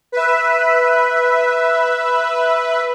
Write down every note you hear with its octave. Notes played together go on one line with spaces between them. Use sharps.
B4 E5